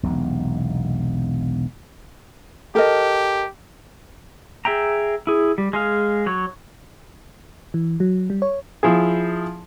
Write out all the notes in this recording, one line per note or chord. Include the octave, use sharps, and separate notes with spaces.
E1 B1 C3
G4 A4 A#4 D#5
G#4 E5 G5 A#5
E4 G#4
G3
G#3 G#4 F5
F#3 C#5
E3
F#3
G3
C#5
F3 E4 G#4